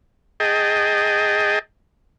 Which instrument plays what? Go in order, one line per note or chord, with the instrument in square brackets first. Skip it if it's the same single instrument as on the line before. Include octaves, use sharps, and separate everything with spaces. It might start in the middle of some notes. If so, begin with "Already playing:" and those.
[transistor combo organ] G#4 D#5 G5 A5